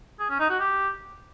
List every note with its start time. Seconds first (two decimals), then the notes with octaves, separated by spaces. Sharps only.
0.20 G#4
0.30 C#4
0.40 D#4
0.50 F#4
0.60 G4